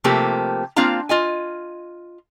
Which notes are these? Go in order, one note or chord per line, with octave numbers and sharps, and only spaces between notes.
C3 F3 A3 A#3 C4 G4
A#3 C4 D4 F4 F5 A#5
F4 D#5 G#5